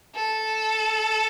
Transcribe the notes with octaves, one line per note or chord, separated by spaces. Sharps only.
A4